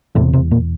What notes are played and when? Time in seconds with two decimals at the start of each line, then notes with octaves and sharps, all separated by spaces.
0.15 E1 E2 A2 C3 A3
0.33 C3 C4
0.51 A#2 A#3